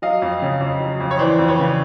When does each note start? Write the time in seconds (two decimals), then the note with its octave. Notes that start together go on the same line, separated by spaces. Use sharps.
0.02 F#3 D#5 F5
0.22 F2
0.42 C#3
0.61 F2
0.80 F#3
1.00 F2
1.11 C#5
1.19 E3 C5 D5
1.39 F2
1.48 B4 C#5
1.59 C#3